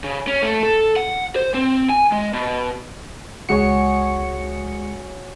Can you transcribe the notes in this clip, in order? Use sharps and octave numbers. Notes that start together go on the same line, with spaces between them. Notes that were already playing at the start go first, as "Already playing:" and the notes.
C#3
C#4
A3
A4
F#5
C5
C4
G#5
G#3
B2
C#2 G#3 F#4 G#4 C#5 C#7